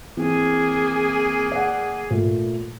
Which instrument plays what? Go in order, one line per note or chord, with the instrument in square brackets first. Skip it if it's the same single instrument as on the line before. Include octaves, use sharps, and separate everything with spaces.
[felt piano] E3 C4 [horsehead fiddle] A#3 G#4
[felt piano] D5 F#5
A#2 A3